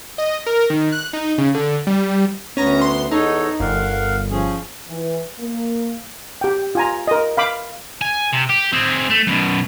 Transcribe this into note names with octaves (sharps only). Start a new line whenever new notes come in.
D#5
A#4
D#3
F#6
D#4
C#3
D3
G3
D2 B3 C#4 A#5
C6
E2 D#4 A4 C#5
G1 A#4 F5 F#5
F3 C#4 G#4
E3
A#3
G4 G5
F4 G#5 A#5
A#4 D#5
F5 B5 D6
G#5
C3
G4
C4 G#4
A3
F#2 B2